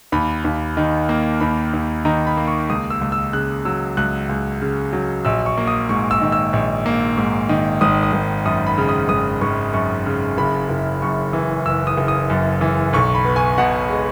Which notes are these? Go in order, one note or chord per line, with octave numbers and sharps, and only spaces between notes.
D#2 B5
D#2
D#3
A#3
D#2 B5
D#2
D#3 A#5
B5
A#3
C#6
C#2 D#6
E6
C#2
E6
C#3 F#6
F#3 E6
C#2 F#6
C#2
C#3
F#3
A#1 E6
C#6
A#3
D#6
G#2 C#6
E6
D#3
E6
A#1
A#3
G#2
D#3
G#1 D#6
D#6
G#1
F#2 D#6
B5
C#3
D#6
G#1 D#6
G#1 C#6
F#2 C#6
C#3
F#1 B5
F#1
F#2 C#6
E3
F#1 E6
D#6
F#1
D#6
F#2
E3
B1 C#6
B5
B3
G#5
B2 F#5
G#3